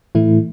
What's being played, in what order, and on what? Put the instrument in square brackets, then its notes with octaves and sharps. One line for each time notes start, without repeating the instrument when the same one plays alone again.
[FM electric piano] A2 E3 A3 E4